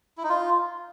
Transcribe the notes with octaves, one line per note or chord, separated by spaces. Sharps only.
E4
D#4
F4